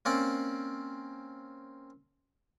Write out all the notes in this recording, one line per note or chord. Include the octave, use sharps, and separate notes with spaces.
A#3 C4 C#4 D5